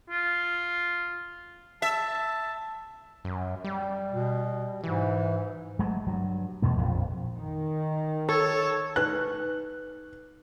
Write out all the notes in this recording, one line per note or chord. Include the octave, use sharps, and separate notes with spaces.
F4
E5 A5
F#2
G3
B2
G#2 E3
F#3 G#3 A3
G2 F#3
E2 B2 A3
A#1 F2 A#2
D#3
A4 C#5 E6
D#4 B4 G#5 F#6